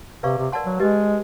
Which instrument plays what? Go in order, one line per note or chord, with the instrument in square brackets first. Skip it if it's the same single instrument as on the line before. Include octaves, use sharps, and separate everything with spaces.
[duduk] C3 [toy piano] B4 D5 F5 A#5 C#6
[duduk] C3
[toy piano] A#4 D5 F#5 A5 C6
[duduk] F#3
[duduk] G#3 [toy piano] G4 B4 D#5